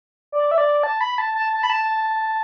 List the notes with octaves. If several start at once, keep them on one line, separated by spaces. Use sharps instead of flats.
D5
E5
D5
A5
B5
A5
A5
A5
B5
A5